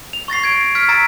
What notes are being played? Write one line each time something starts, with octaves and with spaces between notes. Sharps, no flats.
F7
C#6 A6 A#6 C7
G#6 D7
F6 G#6 B6 D7
A#5 E6 A6 B6 D7